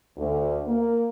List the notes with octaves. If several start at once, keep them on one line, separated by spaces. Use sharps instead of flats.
D2
A#3